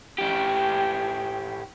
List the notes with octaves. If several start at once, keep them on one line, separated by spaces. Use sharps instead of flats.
A2 G4